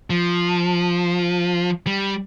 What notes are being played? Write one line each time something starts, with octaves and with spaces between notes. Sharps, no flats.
F3
G3